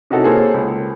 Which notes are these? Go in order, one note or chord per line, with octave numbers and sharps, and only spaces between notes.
C3 C#4 D#4 E4 F#4 A4
A#3 G#4 A4 C5 C#5
C#2